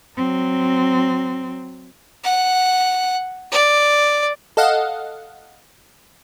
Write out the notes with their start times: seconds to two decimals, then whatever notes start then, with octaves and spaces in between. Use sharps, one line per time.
0.17 F#3 C4
2.24 F#5
3.52 D5
4.57 A4 D#5 F5 F#5